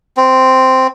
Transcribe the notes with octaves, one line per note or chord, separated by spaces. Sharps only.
C4